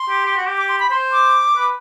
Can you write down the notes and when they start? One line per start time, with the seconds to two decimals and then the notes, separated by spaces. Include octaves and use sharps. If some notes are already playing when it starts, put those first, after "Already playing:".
Already playing: C6
0.09 G4
0.25 G4
0.37 F#4
0.47 G4
0.57 D6
0.69 C6
0.80 B5
0.91 C5 C6
1.12 D6
1.56 B4